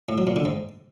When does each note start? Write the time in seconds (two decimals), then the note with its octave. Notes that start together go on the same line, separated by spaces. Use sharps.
0.09 A2
0.18 F#3
0.27 A#2
0.36 D3
0.45 G#2